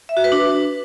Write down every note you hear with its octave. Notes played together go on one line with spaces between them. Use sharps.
E5
F#4
B4
D4